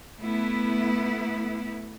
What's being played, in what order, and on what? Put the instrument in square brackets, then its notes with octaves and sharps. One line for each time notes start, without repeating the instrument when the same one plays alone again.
[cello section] A3 B3 E4